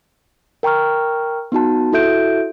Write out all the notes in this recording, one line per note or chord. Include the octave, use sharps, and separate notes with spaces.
A#4 G5 A#5 C#6 F6
B3 D#4 F#4 A5
E4 F#4 A4 E5 G6 D7